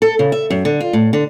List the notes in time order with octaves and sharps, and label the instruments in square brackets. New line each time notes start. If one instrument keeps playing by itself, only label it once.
[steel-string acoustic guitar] A4
C#3
E5
F#2
D3
F4
A2
D3